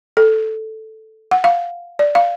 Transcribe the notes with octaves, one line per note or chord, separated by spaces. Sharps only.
A4
F#5
F5
D5
F5